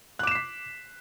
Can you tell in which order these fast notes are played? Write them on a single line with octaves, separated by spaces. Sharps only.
F#6 D6 E7 C7 B6